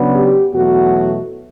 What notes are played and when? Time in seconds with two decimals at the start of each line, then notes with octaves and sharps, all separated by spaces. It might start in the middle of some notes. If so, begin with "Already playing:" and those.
Already playing: C#3 F#3 B3 D4
0.14 G4
0.54 E2 B2 F#3 A3 F#4